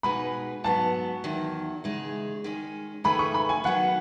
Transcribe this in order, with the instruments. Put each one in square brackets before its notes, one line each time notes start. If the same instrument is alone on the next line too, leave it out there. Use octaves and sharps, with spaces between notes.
[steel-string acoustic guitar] B2 G#3 D#4 G#4 B4 [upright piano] B5
[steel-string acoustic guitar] G#2 F#3 B3 [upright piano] A5
[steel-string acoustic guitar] E2 D#3 F#3
E2 C#3 G#3 D#4 G#4
D#3 G#3 C#4
[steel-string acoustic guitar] D#3 A3 C#4 G#4 B4 [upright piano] B5
[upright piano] C#6
B5
G#5
[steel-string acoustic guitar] D#3 F#3 B3 [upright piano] F#5